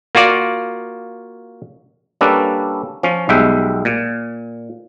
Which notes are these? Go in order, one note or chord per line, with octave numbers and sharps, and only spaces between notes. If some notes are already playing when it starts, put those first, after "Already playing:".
A#3 F4 F#4 D5
G3 A#3 C#4 D4 A4 B4
F3 C#4
B1 G3 G#3 E5 F#5 G5
A#2